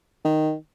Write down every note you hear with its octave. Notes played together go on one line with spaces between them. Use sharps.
D#3